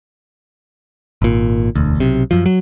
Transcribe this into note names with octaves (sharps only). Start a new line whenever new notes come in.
G#1 A#2
E1 D2
B1 C3
F#2 F3
F#3